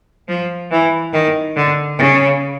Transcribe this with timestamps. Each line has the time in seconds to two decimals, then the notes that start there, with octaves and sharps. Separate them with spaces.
0.28 F3
0.71 E3
1.13 D#3
1.56 D3
1.98 C#3